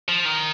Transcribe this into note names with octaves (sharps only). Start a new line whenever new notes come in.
F3
D#3